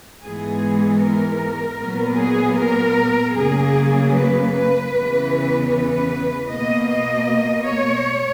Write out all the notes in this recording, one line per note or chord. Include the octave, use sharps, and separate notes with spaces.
G#2 E3 G#3 B3 G#4
A#4
A#2 F#3 B3
G#4
A#4
F#2 C#3 F#3 A#3 G#4
B4
B4
E2 C#3 E3 B3
B4
B2 A#3 D#5
D#5
C#5